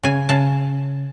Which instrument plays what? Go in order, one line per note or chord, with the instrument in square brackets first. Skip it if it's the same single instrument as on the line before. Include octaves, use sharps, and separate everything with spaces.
[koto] C#3 G#5
C#3 A5